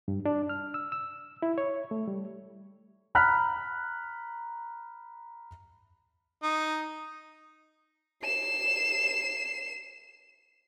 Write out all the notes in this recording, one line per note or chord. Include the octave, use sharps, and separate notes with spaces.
G2
D4
F6
E6
E6
E4
C#5
A3
G3
A#5 B5 F6 F#6 B6
D#4
C7 E7